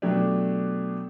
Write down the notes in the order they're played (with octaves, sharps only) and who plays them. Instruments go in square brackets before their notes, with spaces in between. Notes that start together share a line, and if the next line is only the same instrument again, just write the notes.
[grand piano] B2 F#3 A3 D4 G4